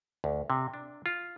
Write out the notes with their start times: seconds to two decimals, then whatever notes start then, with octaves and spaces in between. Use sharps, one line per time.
0.24 D2
0.50 C3
0.74 D4
1.06 F4